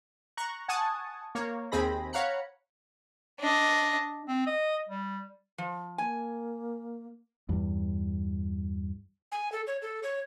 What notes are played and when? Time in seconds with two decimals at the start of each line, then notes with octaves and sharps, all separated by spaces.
0.37 A#5 C#6 F#6
0.68 F#5 G#5 A5 C#6 D#6
1.35 A#3 C#5
1.72 D#2 C4 G#4 B5 A#6
2.13 C#5 F5 F#5 A#5 B5 C#7
3.39 D4 D#5
4.28 C4
4.47 D#5
4.89 G3
5.58 F3
5.98 A#3 G#5
7.49 E2 G2
9.32 G#5
9.52 A4
9.67 C#5
9.82 A4
10.03 C#5